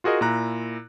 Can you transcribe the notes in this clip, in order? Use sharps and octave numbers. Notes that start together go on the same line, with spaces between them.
F4 F#4 G#4 A#4 D#5
A#2 E4 A#5 F#6